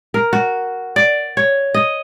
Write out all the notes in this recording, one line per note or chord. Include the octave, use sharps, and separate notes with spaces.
A#4
F#4
D5
C#5
D#5